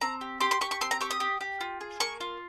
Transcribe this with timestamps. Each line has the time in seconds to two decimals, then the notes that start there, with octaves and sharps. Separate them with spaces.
0.01 C4 A#5
0.21 G4
0.40 G4 C6
0.51 C6
0.61 G4 C#6
0.71 C#6
0.81 C4 C6
0.91 A#5
1.01 G4 C#6
1.11 D#6
1.20 G4
1.41 G4
1.61 F4
1.81 G#4
2.00 A#3 C#6
2.20 F4